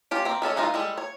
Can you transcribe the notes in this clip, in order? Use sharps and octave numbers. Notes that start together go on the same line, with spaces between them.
C#4 F4 G4
A#3 C4
G#3 C#4 A4 C#5
E3 F3 G#3 D#4 F4
G3 G#3 A4
C#5